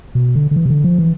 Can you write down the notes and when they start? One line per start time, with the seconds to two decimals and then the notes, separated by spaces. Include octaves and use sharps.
0.15 B2
0.35 D3
0.51 D3
0.56 E3
0.66 C3
0.70 D3
0.84 F3
0.98 E3